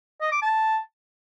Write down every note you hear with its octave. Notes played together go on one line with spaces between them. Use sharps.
D#5
D6
A5